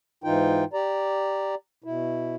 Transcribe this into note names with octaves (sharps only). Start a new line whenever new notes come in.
G#2 E3 D#4 F4 G5
G4 D5 A#5
B2 E4